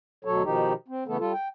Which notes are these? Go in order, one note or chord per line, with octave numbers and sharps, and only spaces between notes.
D2 B2 F#3 A4 C#5
B2 D#3 F3 D#4 G4
C4
C#3 E3 A3 B3 A4
G3 F4 A4
G5